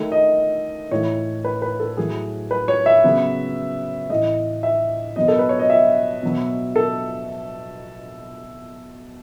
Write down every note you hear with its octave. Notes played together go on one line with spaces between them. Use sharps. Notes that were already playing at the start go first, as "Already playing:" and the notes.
Already playing: D#3 A3
D#5
A2 E3 A3 C#5
B4
B4
A4
A2 F#3 A3 G#4
B4
C#5
E5
C#3 F#3 B3
A2 E3 A3 D#5
E5
B2 F#3 B3 D#5
A4
B4
C#5
D#5
E5
B2 F#3 B3
A4